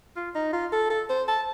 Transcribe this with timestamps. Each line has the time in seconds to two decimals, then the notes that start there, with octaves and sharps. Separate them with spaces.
0.16 F4
0.35 D#4
0.53 F4
0.73 A4
0.90 A4
1.09 C5
1.28 A5